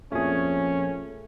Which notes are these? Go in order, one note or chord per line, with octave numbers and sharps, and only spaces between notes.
A#1 F2 A#2 A3 C#4 G#4